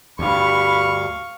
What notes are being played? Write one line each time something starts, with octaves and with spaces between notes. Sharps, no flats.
D2 G2 G4 F5 B5 C#6